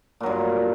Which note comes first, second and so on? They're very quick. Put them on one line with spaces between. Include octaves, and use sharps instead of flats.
A#2 F#3 G2